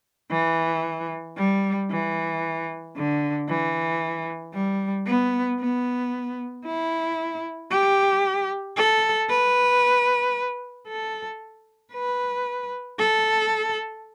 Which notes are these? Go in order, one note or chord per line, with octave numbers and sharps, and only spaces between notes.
E3
G3
E3
D3
E3
G3
B3
B3
E4
G4
A4
B4
A4
B4
A4